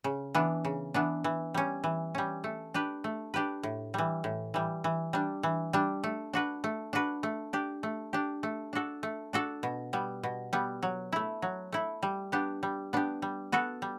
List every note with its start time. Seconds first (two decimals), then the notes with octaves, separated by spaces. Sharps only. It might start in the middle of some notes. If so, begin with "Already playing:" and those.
0.04 C#3
0.35 E3 B3 D4
0.65 C#3
0.94 E3 B3 D4
1.24 E3
1.54 G3 C#4
1.84 E3
2.15 G3 C#4
2.44 A3
2.74 D4 G4 B4
3.04 A3
3.34 D4 G4 B4
3.63 A2
3.94 E3 G3
4.24 A2
4.54 E3 G3
4.84 E3
5.13 G3 D4
5.43 E3
5.73 G3 D4
6.04 A3
6.33 D4 F#4 B4
6.64 A3
6.93 D4 F#4 B4
7.23 A3
7.53 D4 G4
7.83 A3
8.13 D4 G4
8.43 A3
8.73 D4 F#4 A4
9.03 A3
9.33 D4 F#4 A4
9.63 B2
9.93 G3 B3
10.23 B2
10.53 G3 B3
10.83 F#3
11.12 A3 E4
11.42 F#3
11.72 A3 E4
12.03 G3
12.32 B3 D4 G4
12.63 G3
12.93 B3 D4 G4
13.22 G3
13.52 B3 F#4 A4
13.82 G3